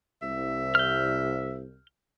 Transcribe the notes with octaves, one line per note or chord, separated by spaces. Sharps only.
C2 E5
F6 G6